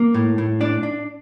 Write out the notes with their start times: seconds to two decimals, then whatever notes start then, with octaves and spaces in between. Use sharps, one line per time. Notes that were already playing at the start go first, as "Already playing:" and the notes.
Already playing: A#3
0.14 A2
0.38 A2
0.61 D4 D5
0.83 D4